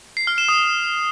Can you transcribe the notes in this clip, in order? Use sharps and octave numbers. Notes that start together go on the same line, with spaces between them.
C7
F6
E7
D#6